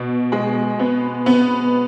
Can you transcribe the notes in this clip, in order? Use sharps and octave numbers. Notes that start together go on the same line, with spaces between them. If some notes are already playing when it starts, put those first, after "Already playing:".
Already playing: B2
G#3
B3
B3